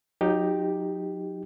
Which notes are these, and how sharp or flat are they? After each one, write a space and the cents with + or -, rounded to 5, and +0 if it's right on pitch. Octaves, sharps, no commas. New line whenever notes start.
F#3 -30 D#4 +0 G4 +5